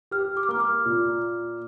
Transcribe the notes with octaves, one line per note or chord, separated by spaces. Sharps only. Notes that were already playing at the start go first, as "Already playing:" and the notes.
G4 F6
D6
F6
A#3 D6
F6
A#2